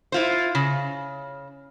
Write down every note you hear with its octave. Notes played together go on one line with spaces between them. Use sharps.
E4 F4 C5
C#3